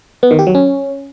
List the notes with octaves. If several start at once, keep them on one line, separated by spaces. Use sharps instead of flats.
B3
D#3
G4
F#3
C#4